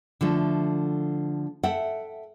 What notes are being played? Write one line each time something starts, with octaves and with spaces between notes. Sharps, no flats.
D3 F3 A3
A4 E5 F#5 G5